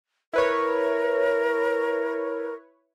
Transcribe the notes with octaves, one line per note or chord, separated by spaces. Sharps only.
E4 A#4 B4 C#5